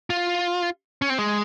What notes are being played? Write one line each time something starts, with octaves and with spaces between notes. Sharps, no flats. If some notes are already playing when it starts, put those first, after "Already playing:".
F4
C#4
C4
G#3